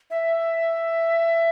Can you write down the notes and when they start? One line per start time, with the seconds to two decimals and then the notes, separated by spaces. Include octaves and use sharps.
0.10 E5